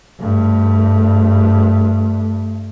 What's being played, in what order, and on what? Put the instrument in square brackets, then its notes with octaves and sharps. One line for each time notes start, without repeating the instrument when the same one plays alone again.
[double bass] G2 A3